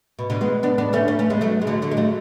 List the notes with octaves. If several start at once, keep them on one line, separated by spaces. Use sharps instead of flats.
B2
B2 D3
G#3 B3
B3 D4
B3 D4
A3 C#4
A3 C#4
A3 C#4
G#3 B3
F#3 A3
G#3
D3 F#3
D3 F#3
G#3
F#3 A3